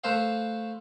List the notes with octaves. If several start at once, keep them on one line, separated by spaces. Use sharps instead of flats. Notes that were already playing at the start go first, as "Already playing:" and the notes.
A3 B4 C5 E5 F5